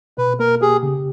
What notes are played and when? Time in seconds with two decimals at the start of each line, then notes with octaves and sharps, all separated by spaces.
0.18 B2 B4
0.39 A#3 A#4
0.61 G4 G#4
0.83 C#3